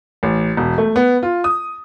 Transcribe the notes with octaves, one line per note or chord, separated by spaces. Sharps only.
A1
E1
A3
B3
F4
D#6